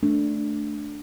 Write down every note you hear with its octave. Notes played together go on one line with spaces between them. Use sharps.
A3 D4